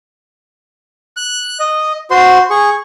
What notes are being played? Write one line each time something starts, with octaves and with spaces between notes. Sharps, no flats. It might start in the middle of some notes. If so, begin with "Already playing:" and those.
F#6
D#5
F#4 C5 C6
G#4 C#6